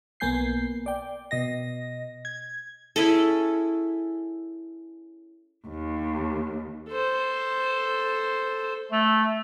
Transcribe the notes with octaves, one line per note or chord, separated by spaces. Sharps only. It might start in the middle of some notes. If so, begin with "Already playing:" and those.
B1 A#3 B3 G#5 G6 C7
D5 G5
B2 D#5 A#6
G#6
C#4 E4 G#4 A4
D#2
A4 C5
A3